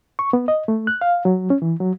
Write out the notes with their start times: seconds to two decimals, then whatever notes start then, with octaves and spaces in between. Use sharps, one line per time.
0.19 C#6
0.33 B3
0.48 D#5
0.68 A3
0.87 F#6
1.01 F5
1.25 F#3
1.50 C#4
1.62 E3
1.80 F#3